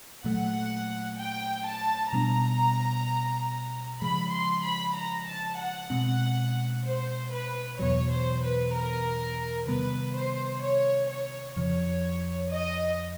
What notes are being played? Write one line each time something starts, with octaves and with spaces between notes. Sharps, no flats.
A#2 F#3 A3 F#5
G5
A5
B2 G3 B3 D4 A#5
C#3 F3 G#3 B5
C6
B5
A#5
A5
F#5
B2 G#3 C4
C5
B4
E2 B2 F#3 C#5
C5
B4
A#4
C3 D#3 G3 B3 B4
C5
C#5
C#5
F2 C#3 F3 C#5
D#5